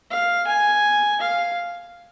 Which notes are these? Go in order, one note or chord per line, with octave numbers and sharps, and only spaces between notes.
F5
G#5
F5